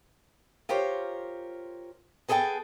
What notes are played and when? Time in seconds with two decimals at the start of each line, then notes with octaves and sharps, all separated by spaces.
0.69 F4 G4 A#4 C5 C#5
2.28 B3 G#4 A4 D5 G5 A5